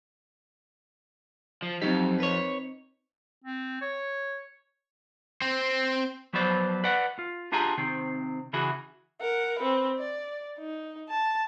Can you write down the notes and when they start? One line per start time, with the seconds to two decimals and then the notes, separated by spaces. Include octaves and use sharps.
1.62 F3
1.82 F2 F#3 C4 D#4 G4
2.20 B4 C#5
3.44 C4
3.81 C#5
5.42 C4 C5
6.33 F3 F#3 B3 B4 C5 D5
6.84 B4 D5 F#5
7.19 F4
7.52 D4 F4 G4 G#4 G#5 A#5
7.78 C3 D#3 C4
8.53 C#3 E3 E4 F#4 G#4
9.21 A#4 F#5
9.59 C4 B4
9.98 D5
10.58 D#4
11.09 A5